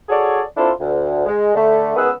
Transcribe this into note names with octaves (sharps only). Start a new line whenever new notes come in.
F#4 G#4 A4 C#5 D5
C4 D4 E4 F4 A4 C5
D2
G#3
D3 A3
C#2 D#3 B3 G#4 F#5 E6